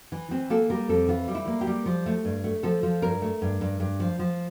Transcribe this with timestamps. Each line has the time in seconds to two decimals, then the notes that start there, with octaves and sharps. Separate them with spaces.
0.12 E3
0.31 E3 C4
0.50 A#3 A4
0.70 G3 A#4
0.89 F2 A4
1.09 E3 F4
1.28 G3
1.35 E4
1.47 A#3
1.61 G4
1.67 G3
1.86 F3
2.06 A3
2.25 G2
2.44 A3
2.63 F3 A4
2.83 F3
3.02 G2 A#4
3.22 A3
3.42 G2
3.61 G2
3.80 G2
4.00 F3
4.19 F3